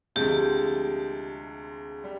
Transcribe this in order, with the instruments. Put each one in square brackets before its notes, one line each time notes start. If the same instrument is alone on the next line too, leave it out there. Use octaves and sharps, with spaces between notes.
[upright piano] D2 C3 F3 G#3 [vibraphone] G4
[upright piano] G3